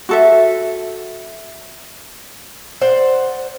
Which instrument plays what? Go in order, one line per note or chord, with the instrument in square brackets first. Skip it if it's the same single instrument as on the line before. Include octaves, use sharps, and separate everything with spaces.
[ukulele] F#4 A4 E5
[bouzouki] C5 D5 F#5